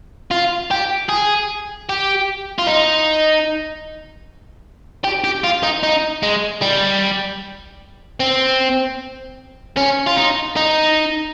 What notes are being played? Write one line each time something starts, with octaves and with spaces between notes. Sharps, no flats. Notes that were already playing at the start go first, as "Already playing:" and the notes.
F4
G4
G#4
G4
F4
D#4
G4
G4
F4
D#4
D#4
G#3
G3
C4
C#4
F4
D#4
D#4